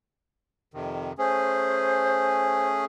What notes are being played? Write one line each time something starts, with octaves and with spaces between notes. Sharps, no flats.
F2 C3 D#3
A3 C#4 G#4 C5